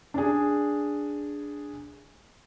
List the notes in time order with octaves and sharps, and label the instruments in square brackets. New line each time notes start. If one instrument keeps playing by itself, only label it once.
[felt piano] D4 G#4